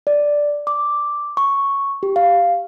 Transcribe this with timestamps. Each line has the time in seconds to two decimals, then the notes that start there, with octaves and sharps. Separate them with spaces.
0.07 D5
0.67 D6
1.37 C#6
2.03 G4
2.16 F5